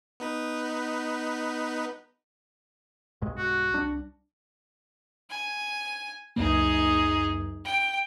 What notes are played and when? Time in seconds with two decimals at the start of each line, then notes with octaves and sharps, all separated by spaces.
0.20 B3 D#4 B4
3.21 B1 G2 G#3
3.38 F#4
3.74 C2 G3 D4
5.30 G#5
6.36 C#2 F#2 A#3 D#4 G#4
7.65 G5